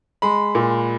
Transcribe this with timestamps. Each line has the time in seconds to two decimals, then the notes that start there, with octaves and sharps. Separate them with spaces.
0.22 G#3 B5
0.55 A#2